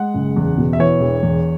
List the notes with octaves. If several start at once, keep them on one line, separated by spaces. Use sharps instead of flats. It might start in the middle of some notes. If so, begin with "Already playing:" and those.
Already playing: G#3 F#5
F#1
E2
B2
E5
E3 C#5
E1
E2